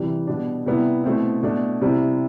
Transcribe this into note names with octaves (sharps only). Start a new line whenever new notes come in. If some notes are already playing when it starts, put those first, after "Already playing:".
Already playing: C3 E3 G3
B2 G3 D4
C3 G3 B3 E4
B2 A3 C4 E4
B2 A3 D4
C3 G3 C4 E4